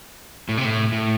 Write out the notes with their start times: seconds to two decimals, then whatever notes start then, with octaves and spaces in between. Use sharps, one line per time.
0.49 A2
0.57 C3
0.65 A2
0.92 A2